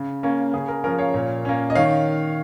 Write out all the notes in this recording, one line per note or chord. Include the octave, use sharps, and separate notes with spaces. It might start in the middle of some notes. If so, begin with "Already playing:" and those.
Already playing: C#3
A#3 C#4
C#3 G#4
A#4
F3 C#4 A#4
C#5 F5
A#2
A#3 C#4
D#5
D#3 C#5 F5